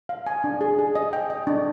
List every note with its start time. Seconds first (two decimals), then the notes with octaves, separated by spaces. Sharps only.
0.09 F5
0.27 G#5
0.44 D4
0.61 G#4
0.79 G#4
0.95 D#5
1.13 G5
1.30 D#5
1.47 D4